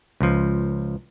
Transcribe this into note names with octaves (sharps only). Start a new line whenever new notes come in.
C#2 F3